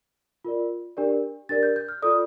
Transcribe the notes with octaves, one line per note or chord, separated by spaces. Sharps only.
F4 A#4 D5
D4 G4 A#4 D5
D4 G4 A#4 D5 A6
G6
G6
F6
F4 A4 D5 D#6